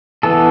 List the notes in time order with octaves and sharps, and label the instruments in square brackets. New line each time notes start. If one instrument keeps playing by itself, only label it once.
[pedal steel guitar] E3 B3 A4